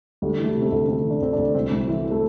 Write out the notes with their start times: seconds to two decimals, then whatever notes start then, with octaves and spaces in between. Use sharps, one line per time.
0.22 D2 G3
0.38 E3
0.44 A3
0.55 C3
0.62 C4
0.66 A3
0.72 D2
0.88 D2 C4
1.04 E3
1.10 D4
1.21 D2 C4
1.33 D4
1.38 D2
1.55 C2 C4
1.71 C2
1.88 E3
2.11 A3